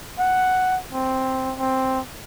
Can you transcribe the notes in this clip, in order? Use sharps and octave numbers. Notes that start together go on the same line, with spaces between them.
F#5
C4
C4